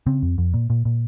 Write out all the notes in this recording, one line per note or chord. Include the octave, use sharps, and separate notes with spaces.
C#3 C4
F2
F2
A#2
A#2
A#2